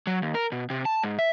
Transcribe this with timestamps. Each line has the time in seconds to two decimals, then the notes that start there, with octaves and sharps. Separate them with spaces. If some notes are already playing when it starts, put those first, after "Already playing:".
0.07 F#3
0.22 D#2
0.35 A#4
0.52 B2
0.70 C3
0.85 A5
1.03 G#2
1.19 E5